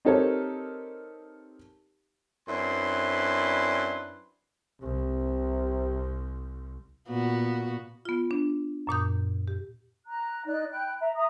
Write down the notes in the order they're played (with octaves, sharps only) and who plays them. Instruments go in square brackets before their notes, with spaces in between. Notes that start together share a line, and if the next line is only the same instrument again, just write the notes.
[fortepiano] C4 D#4 G4 A4 A#4 C#5
[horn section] F#2 C4 D4 E4 B4 C6
[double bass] C2 [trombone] C3
[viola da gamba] A#2 B3 F#4
[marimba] B3 F4
D4
F#2 A#2 D#6 G6
G4
[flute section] A#5 F#6
D#4 D5 F#6
G5 B5 F#6
E5 A#5
E5 A#5 D#6